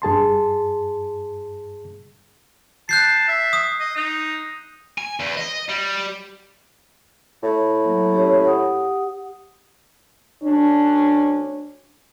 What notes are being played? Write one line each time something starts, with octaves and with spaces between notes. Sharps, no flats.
G2 G#4 A5 C6
A5 F#6 G6 C7
E5
D#6
D#5
D#4
G#5
E2
D#5
G3
A2
F#3 A#3
C#4 G4 C#5
G4 F#5 D#6
D2 C#4 D4